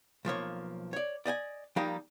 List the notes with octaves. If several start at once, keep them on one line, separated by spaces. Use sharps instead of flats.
B1 F3 A#3 C#5
C#5 D5
D5 D#5 G5 G#5
F3 G3 A#3 D#4 G4